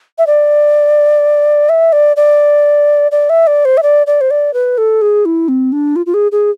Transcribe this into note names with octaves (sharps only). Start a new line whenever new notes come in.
E5
D5
E5
D5
D5
D5
E5
D5
C5
E5
D5
D5
C5
D5
B4
A4
G#4
E4
C4
D4
F4
F4
G#4
G#4